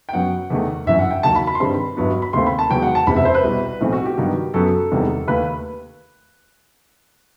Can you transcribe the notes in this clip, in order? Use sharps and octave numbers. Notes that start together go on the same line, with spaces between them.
G5
F#2 F#3 B3 F#5
E2 D#3 A3
G1 F#2 E3 E5
F#5
G5
D#2 D#3 F#3 A5
B5
B5
C6
G2 D#3 G3 C4 B5
G1 G2 F#3 B3
B5
D#2 D#3 A3 C4 C6
B5
A5
E1 E2 D#3 F#3 G5
F#5
A5
F#1 E2 C3 B5
E5
C5
B4
C2 B2 G3
B1 A2 E3 A3 C4
F#4
G4
G2 D#3 F#3 B3
F#2 F#3 B3 A4
E1 E2 C3 D#3 G3
D#2 D#3 A3 B4